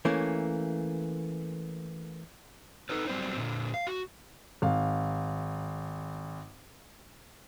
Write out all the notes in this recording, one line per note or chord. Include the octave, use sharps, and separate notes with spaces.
E3 A3 A#3 C#4
D#4 A4 B4
F#3 G3 C4 B4 C5
A#2 D3
F5
F#4
G#1 F5